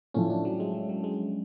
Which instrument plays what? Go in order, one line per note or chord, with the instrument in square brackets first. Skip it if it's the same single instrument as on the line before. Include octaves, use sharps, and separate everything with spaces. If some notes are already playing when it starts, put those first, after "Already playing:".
[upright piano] A2 F3 A3 [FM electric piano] C#4
[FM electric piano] D4
F#3
G#3
F#3
F#3
G#3